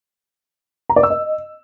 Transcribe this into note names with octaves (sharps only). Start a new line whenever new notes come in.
A#5
D5
E6
D#5